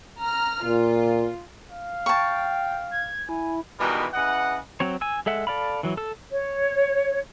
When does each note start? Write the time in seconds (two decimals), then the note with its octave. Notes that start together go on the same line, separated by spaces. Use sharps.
0.21 A#5 F6
0.65 A#2 F4
1.70 F5
2.06 G5 A5 C#6
2.91 G#6
3.29 E4 G#5
3.80 B2 D#3 E3 G3 G#3 A#4
4.14 C#3 E3 D#5 F#5
4.80 F#3 C4 C#5
5.01 G#5 E6
5.26 G#3 A4 E5 F#5
5.47 A4 D5 F5 B5
5.83 E3 F#3
5.97 A4 E6
6.32 C#5